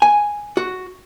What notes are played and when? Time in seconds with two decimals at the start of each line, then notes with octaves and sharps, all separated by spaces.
0.02 G#5
0.57 F#4